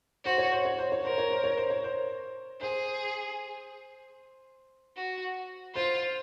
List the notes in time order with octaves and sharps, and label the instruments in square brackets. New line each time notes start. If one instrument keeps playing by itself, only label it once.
[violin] F#4 [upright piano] C5
[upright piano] C#5
C5
C#5
C5
C#5
[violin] A#4 [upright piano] C5
[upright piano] C#5
C5
C#5
C5
C#5
C5
[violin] G#4 [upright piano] C5
[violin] F#4
[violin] F4 [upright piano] C5